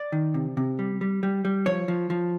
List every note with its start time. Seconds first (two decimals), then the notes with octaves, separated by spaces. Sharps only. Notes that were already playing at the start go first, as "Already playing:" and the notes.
Already playing: D5
0.12 D#3
0.34 C3
0.57 C3
0.79 G3
1.01 G3
1.23 G3
1.45 G3
1.66 F3 C#5
1.88 F3
2.10 F3